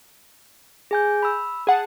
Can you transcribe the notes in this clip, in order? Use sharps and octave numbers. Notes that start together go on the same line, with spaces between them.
G#4 G#5 G6
B5 E6
G#4 F#5 A5